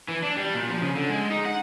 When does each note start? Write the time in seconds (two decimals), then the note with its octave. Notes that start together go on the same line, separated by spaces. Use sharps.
0.08 E3
0.23 D4
0.37 G3
0.54 A#2
0.69 F3
0.82 C#3
0.95 D3
1.10 G#3
1.30 D#4
1.45 F#5